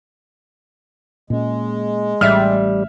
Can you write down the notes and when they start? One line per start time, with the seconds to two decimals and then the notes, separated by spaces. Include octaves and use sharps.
1.30 A#2 G#3 C#4
2.21 A1 A2 G3 E5 F6